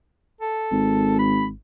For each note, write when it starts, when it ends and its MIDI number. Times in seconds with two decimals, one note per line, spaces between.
0.41 1.15 69
0.72 1.53 32
1.19 1.45 83